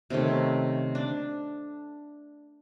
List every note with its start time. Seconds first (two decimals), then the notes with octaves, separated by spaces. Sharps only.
0.10 C3 D#3 A3 C#4
0.95 D4